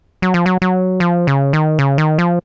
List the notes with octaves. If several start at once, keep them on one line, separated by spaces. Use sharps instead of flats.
F#3
F3
F#3
F#3
F3
C#3
D#3
C#3
D#3
F3